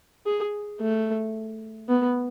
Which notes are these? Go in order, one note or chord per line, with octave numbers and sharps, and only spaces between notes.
G#4
A3
B3